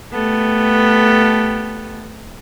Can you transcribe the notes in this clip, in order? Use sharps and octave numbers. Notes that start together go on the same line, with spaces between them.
A3 B3 G4 A4